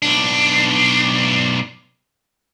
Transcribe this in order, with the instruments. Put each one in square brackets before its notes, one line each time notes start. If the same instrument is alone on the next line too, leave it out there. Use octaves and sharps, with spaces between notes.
[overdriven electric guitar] B1 D4